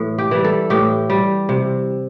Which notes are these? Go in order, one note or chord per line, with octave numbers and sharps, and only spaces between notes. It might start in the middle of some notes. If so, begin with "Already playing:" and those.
Already playing: A2 E3 A4
G4
E3 G3
A4
A2 G4
G3
C3